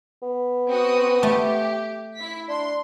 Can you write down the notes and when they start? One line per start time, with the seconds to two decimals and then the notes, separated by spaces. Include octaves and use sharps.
0.22 B3
0.69 C4 F#4 D#6
1.23 A3 G4
2.17 E4 B6
2.49 D4 C6